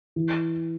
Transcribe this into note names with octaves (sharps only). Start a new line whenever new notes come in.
E3